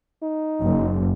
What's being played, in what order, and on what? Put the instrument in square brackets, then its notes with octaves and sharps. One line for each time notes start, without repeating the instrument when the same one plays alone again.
[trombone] D#4
[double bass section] F#1